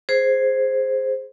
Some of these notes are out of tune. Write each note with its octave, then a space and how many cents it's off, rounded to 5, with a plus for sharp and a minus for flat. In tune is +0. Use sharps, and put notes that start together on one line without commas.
G#4 +0 C5 +0